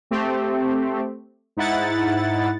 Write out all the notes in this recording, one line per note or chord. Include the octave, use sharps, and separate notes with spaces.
A3 C4 G4
G#2 D#4 E4 F#5 A6